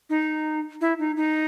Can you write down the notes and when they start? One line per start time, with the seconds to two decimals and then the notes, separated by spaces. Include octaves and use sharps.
0.10 D#4
0.81 E4
0.99 D#4
1.17 D#4